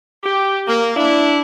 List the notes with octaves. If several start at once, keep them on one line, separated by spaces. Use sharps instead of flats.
G4
A#3
D4 E4